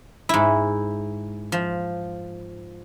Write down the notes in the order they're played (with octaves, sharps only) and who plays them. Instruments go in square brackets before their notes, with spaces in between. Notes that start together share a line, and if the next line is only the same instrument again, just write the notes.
[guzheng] G#2 E4
F3